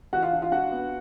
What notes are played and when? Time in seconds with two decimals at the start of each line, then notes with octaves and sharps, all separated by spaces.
0.13 E3 F#4 F#5
0.22 F4 F5
0.32 D4
0.42 F4 F5
0.52 D4 F#4 F#5
0.71 B3